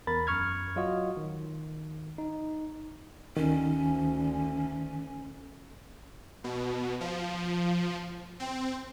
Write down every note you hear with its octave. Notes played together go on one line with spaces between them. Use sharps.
E2 A#4 B5 A6
F#2 C#6 F6 G#6
F#3 F4 F#4 D#5
D#3
D#4
D2 D#3 C#4
B2
F3
C4